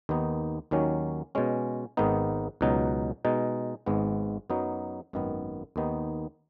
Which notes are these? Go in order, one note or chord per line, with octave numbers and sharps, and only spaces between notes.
D#2 D#3 B3 D#4
D#2 D#3 F#3 C#4
B2 G#3 C#4
G#1 G#2 D#3 B3 D#4
C#2 B2 F#3 D#4
B2 G#3 D#4
G#1 G#2 G#3 B3
F#2 F#3 B3 D#4
G#1 F#2 D#3 B3
D#2 D#3 B3 D#4